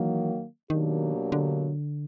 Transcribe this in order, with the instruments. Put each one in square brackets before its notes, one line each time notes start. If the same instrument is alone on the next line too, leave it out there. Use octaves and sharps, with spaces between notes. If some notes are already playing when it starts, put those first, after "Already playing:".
Already playing: [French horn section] D#3 F#3 A#3 [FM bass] E3
[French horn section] B2 F#3 A#3 D4 G4 [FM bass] D#3
[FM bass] D3